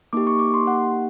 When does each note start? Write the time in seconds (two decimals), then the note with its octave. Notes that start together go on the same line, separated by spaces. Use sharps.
0.13 A#3 D#4 G4 D6
0.27 C#6
0.39 D6
0.54 C6
0.67 F#5